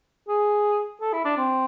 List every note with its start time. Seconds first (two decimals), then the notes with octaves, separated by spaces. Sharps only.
0.28 G#4
1.01 A4
1.13 E4
1.25 D4
1.37 C4